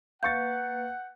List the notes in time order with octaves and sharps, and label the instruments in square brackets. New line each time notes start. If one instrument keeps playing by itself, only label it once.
[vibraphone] A#3 B4 [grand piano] F5 C#6 A6 [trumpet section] F#5 [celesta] G6 C#7